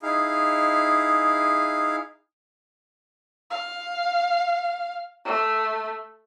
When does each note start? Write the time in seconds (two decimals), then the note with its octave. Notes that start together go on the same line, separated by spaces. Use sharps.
0.03 D#4 E4 G#4 F5
3.50 F5
5.25 A3